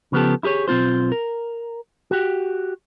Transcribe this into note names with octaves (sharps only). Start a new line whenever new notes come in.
C#3 F3 B3 G4 A4
E4 G4 G#4 C#5
B1 C4 F4 C5
A#4
F#4 G4